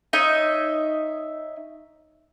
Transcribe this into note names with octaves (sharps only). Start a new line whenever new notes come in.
D#4 C#5 D#5 E5